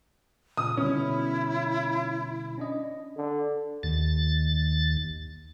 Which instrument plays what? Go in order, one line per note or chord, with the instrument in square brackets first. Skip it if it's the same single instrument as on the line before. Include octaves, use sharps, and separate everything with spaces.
[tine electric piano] A#2 C#3 [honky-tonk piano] D#6
[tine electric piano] B2 D3 G3 [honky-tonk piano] C#4 [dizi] E4
[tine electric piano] C#4 D4 D#5
[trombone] D3
[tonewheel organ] D#2 A6